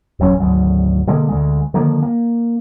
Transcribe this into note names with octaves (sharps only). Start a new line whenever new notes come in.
E1 A1 F#3 C#4
G#1 D2 F#3
B2 D3 G#3 A#3
D2 D3 G#3
D3 D#3 F3 A#3
A#3